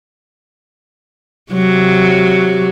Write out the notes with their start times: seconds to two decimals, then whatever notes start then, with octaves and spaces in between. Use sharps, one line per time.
1.53 C3 F#3